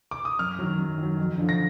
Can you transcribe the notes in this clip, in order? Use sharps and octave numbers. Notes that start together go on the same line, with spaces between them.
D6
D#6
F#2 F6
D#3 F#3
F#2
D#3 F#3
F2
D3 F3
A#6